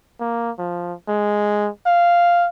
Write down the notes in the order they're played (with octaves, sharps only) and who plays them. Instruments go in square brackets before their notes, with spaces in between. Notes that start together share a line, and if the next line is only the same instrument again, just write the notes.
[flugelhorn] A#3
F3
G#3
F5